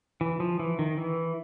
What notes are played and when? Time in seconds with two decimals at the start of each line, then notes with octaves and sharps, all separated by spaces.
0.21 E3
0.40 F3
0.60 E3
0.79 D#3
0.98 E3